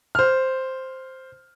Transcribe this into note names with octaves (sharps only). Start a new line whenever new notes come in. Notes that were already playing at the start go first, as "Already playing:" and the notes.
C5 F6